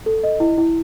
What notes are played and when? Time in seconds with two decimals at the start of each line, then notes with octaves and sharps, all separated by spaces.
0.06 A4
0.23 D#5
0.40 E4
0.58 E4